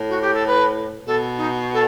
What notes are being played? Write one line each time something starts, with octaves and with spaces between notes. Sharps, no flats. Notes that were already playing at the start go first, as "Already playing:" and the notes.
Already playing: A2
F#4
G4
A4
B4
B2 A4
D#4
A4